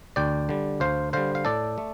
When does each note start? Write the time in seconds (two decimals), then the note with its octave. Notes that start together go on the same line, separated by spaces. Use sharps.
0.16 D2 D5 G5
0.49 D3 G3
0.80 D2 C5 F5
1.13 D3 G3 C5 F5
1.35 F5
1.45 A2 A4 D5
1.78 A3